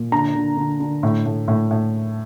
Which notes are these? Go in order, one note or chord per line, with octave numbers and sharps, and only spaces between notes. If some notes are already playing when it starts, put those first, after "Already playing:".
Already playing: A#2
D3 A#5
D3
D3
D3
A2
A2
A2
A2